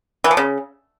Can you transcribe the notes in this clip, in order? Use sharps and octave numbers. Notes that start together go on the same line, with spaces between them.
E3
F3
C#3